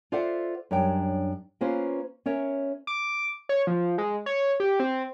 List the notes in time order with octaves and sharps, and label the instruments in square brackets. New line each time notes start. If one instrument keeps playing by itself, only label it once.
[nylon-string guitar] F4 A4 C5 D5 E5 F#5
F#2 G3 D4 C#5 G5
A#3 C#4 F4 B4 C5
C#4 A#4 C#5 E5
[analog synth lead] D6
C#5
F3
G#3
C#5
G4
C4